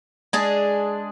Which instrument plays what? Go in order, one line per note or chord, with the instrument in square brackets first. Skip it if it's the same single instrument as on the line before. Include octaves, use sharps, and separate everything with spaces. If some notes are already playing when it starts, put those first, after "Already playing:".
[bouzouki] G#3 D4 G#4